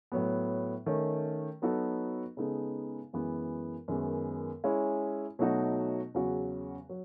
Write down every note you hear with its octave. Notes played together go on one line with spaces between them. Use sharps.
A2 F#3 B3
D#3 A3 C#4
F#3 B3 D#4 F#4 A4
C#3 G#3 B3 D#4 A4
F#2 E3 G#3 B3
F#2 D#3 G#3 B3
G#3 C#4 E4
B2 F#3 A3 D#4 F#4
E2 C#3 F#3 C#4 F#4
F#3